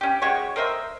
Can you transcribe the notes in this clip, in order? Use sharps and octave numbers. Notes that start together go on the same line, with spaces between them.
C#4 G4
G#3 F#4 G4 C#5
A#4 C5 D#5 E5